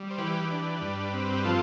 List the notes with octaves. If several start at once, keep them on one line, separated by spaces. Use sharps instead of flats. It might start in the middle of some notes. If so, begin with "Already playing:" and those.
Already playing: G3
C5
E3 G4 B4
D4
G2
C4
G4
F3 F4 A4